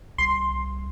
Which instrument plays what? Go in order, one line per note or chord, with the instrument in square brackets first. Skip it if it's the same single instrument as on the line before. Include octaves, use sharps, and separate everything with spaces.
[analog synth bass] C2 [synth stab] C6